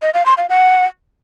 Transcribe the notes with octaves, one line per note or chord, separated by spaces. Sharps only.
D#5
F5
C6
F5
F#5